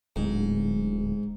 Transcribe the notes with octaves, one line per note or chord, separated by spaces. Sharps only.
D1 G#2